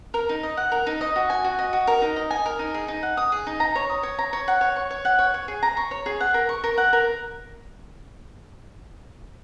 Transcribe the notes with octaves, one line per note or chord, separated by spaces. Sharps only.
A#4
D#4
D#5
F#5
A#4
D#4
D#5
F#4
G#5
F#4
D#5
F#4
A#4
D#4
D#5
G#5
A#4
D#4
G#4
D#4
F#5
D#6
G#4
D#4
A#5
C#5
D#6
C#5
A#5
C#5
F#5
C#5
C#6
C#5
F#5
C#5
C#5
G#4
A#5
C#6
C#5
G#4
F#5
A#4
C#6
A#4
F#5
A#4